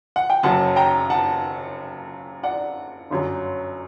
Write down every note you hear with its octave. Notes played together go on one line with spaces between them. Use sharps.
F#5
G5
F#1 F#2 F#3 F#5 A5
G5 A#5
F#5 A5
D5 F#5
G1 F#2 F#3